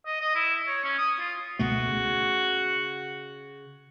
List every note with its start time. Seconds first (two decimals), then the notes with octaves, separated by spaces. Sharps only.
0.06 D#5
0.21 D#5
0.35 E4
0.67 C#5
0.84 C#4
0.98 D#6
1.20 F4
1.59 C#2 B2 A3 F#4
1.88 C#3